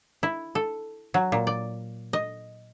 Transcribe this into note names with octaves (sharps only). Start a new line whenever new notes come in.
E4
A4
F#3
A#2
D5
D#5